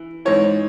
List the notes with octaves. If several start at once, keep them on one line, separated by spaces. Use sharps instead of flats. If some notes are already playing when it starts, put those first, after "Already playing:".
Already playing: E3
G#2 E3 C#5